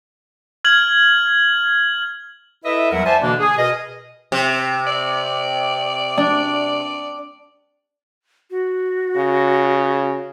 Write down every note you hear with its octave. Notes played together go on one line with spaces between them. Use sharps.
F6 G#6 F#7
E4 A4 B4 D#5 E5
E2 F#3 G3 A#4 E5 F#5
C5 D5 E5 G#5 A5
B2 D3 E3 A#3 D4
G#4
B2 A#4 B4 D#5
C3
D5
D4
F#4
C#3